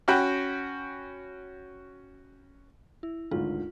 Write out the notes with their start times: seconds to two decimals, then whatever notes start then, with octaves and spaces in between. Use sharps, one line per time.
0.08 C#4 F#4 F#5 G5 B5
3.03 E4
3.31 G#1 D2 F4